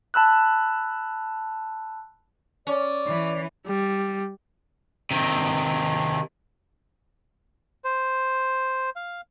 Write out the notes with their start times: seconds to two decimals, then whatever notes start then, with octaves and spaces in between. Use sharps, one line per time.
0.14 A5 B5 E6 F#6
2.67 C#4 D5
3.05 E3
3.66 G3
5.11 C3 D#3
7.84 C5
8.96 F5